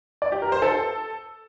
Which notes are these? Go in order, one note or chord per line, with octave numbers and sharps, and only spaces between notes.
D5
G4
A#4
C5
A4